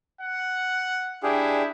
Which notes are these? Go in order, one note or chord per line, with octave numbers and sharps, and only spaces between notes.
F#5
D4 E4 G4 G#4